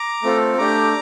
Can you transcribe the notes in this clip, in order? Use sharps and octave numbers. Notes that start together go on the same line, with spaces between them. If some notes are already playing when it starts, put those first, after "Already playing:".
Already playing: A#5 D6
A3 C4 F4 A4
A3 D4 G4 A#5 D6